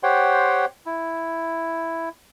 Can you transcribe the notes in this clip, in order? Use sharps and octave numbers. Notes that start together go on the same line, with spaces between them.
G4 C5 C#5 F#5 G5 C6
E4